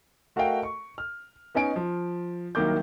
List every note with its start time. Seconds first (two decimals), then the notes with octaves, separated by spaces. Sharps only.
0.36 A3 F#4 A#4 D#5 F5 G5
0.63 C#6
0.98 F6
1.55 B3 C#4 D#4 G#5 D7
1.76 F3
2.55 C2 D#3 F#3 A#3 D6 G6